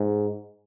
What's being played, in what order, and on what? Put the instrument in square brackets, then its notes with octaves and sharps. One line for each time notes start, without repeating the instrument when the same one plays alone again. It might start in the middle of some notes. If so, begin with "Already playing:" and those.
Already playing: [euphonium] G#2